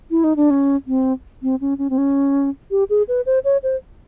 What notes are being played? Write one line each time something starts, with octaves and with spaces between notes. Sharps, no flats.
E4
D#4
D4
C#4
C4
C4
C#4
C#4
C4
C#4
G4
G#4
B4
C5
C#5
C5